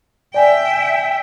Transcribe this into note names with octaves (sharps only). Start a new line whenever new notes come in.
D5 E5 G5 G#5